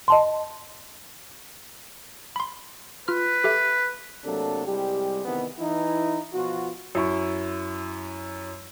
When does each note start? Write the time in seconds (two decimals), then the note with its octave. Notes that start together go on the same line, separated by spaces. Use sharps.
0.08 D#5 A5 C6
2.36 B5 C6
3.08 F4 B4 F6
3.44 G4 A4 E5
4.25 C3 F#3 A3 A#3 D4 A4
4.67 C2 G3 G#3 G4
5.25 C3 D#3 E3 B3
5.59 E3 D#4 E4
6.34 B2 F3 F4 F#4
6.95 F#2 E4 C#6